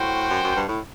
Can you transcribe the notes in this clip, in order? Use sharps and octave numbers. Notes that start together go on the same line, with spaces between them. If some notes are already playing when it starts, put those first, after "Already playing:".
Already playing: A2 F#4 C5 G5
F#2
F#2
G2
A2